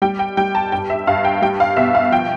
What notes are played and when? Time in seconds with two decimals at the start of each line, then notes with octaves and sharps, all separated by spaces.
0.02 G3 G5
0.19 G5
0.37 G3 G5
0.55 A5
0.72 G2 G5
0.90 E5
1.07 G2 F5
1.25 G5
1.42 G3 G5
1.60 F5
1.77 B2 E5
1.95 F5
2.12 F3 G5